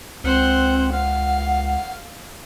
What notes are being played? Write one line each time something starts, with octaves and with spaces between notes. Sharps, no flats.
C#2 C4 C5 F#5
F5 F#5